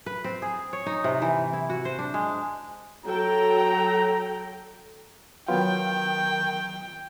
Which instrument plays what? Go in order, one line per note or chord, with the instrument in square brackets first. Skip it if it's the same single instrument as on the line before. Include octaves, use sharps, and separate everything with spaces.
[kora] B4
C4
G#4
C#5
D#4
C3
E3
E4
F#4
C5
D4
G#3
[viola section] F#3 A4 G5 [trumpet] A#5
[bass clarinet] D#3 [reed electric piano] F#3 B3 F4 [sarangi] G5